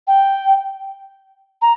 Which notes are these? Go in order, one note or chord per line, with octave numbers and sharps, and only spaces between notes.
G5
A#5